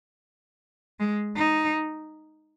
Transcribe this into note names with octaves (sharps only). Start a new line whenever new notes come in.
G#3
D#4